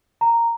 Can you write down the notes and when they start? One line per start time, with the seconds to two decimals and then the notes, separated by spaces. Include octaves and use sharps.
0.21 A#5